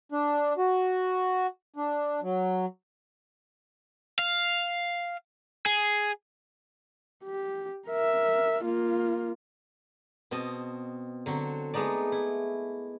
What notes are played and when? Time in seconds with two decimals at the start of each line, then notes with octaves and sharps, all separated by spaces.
0.12 D4
0.58 F#4
1.76 D4
2.22 F#3
4.19 F5
5.66 G#4
7.24 G4
7.87 A#4 E5
8.64 A#3 F4
10.31 B2 C4 D#5 A5
11.26 D3 F#3 C4
11.74 G#3 A3 B3 D#4 D5
12.12 E4